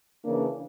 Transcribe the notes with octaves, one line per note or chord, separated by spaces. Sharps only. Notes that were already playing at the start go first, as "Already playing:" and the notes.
C#3 E3 A#3 D4